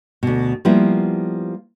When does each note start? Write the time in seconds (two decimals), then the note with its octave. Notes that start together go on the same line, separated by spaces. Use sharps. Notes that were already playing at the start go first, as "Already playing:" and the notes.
0.23 D2 B2
0.65 F3 G3 A#3 B3 E4